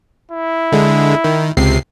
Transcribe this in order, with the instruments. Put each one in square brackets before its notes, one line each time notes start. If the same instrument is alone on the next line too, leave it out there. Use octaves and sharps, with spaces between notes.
[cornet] E4
[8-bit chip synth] D3 G#3
D#3
C#2 C3 C7